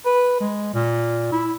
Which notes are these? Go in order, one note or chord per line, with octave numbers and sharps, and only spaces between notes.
B4
G#3
A#2
E4